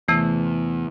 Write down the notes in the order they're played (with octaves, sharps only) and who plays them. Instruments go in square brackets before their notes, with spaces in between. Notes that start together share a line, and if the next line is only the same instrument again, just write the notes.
[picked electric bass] E2 [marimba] C3 E3 A3